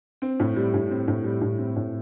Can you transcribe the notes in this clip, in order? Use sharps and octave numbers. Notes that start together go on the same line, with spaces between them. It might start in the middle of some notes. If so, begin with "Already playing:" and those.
C4
A2
G3
A2
C4
A2
G3
A2
C4
A2